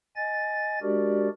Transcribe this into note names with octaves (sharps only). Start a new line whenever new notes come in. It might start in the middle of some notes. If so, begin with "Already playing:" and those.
D#5 G#5 A6
G#3 D4 F#4 G4 A#4 D5